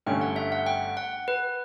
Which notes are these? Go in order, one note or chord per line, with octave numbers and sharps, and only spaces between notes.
G1 G2 D3 A3 C#4 G5
F#5
E5
F#5
G5
F#5
B4